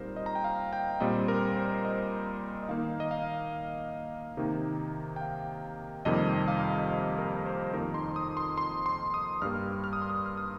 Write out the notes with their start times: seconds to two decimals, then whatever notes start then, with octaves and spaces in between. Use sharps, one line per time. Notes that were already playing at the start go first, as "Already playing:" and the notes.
Already playing: A#2 G3 C4 D#4 A#4 C5
0.16 D#5
0.26 A#5
0.35 G5
0.44 F5
0.73 G5
1.00 A#2 G3 C4 D#5
1.28 A#4
1.57 C5
1.74 C5
1.85 D#5
2.63 D#5
2.69 D#3 A#3 D#4 F5
3.00 D#5
3.11 F5
4.37 C3 D#3 A#3 D#4
5.16 G5
5.21 F5
6.05 F2 C3 D#3 G3 A#3 D#5
6.48 F5
7.18 A#4
7.46 C5
7.74 F2 D#3 A#3 D#4 A#4
7.94 C6
8.16 D#6
8.37 C6
8.58 C6
8.86 C6
9.14 D#6
9.42 G2 G3 A#3 F6
9.84 F6
9.93 D#6
10.02 C6
10.10 D#6
10.26 F6
10.37 D#6